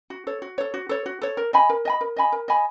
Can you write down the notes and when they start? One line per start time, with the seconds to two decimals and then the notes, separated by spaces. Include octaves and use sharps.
0.10 F#4
0.27 A4 C#5
0.42 F#4
0.58 A4 C#5
0.74 F#4
0.89 A4 C#5
1.06 F#4
1.22 A4 C#5
1.37 A#4
1.53 D#5 G#5 B5
1.69 A#4
1.85 D#5 G#5 B5
2.01 A#4
2.16 D#5 G#5 B5
2.32 A#4
2.48 D#5 G#5 B5